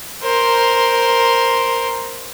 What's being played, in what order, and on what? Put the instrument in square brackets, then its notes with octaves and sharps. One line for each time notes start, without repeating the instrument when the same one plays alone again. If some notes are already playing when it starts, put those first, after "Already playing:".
[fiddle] A#4 C5